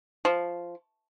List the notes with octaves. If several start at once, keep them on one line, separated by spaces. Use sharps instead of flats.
F3